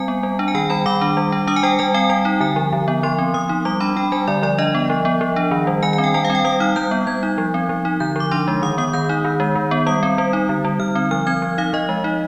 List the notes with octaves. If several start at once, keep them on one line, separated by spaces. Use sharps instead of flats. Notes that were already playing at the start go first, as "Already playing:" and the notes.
Already playing: G3 C4 G#5
B3
G3
D4
G#5
D#3 G5
G3 B5
D#3 D6
D4
G3
D4
D4 D#6
G#5
G3 G5
G3 G#5
C4 G5
G3 G5
D#4
D3 G#5
F3
D3
B3
F3 C6
C4
F3 D#6
D#4
G3 D6
D4 B5
D4 G5
G3 G#5
D3 D5
F3 D5
D4 D#5
B3
F3
B3
F3
D4
D#3
G3
D#3 G#5
G#5
C4
G5
G3 G5
F5
C4
G5
G3 D#6
D#4 F6
G3 G6
B3
G3 G#6
D#4
F3
C4
F3
D#4
D3 G6
F3 D6
D4 C6
G#3
D#3 D#6
B3 D#6
D#3 G6
D#4
D#3
G#3
D#3
B3
G3 D#6
C4
G3
D#4
D3
G3
D3 F6
C4
F3 F6
C4 G#6
F3
D#4 F5
F3 D#5
G#3
D#4